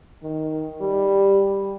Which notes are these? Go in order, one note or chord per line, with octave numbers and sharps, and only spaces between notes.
D#3
G3